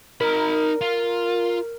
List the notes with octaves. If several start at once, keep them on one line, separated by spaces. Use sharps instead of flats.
D#4 A#4 B5
F4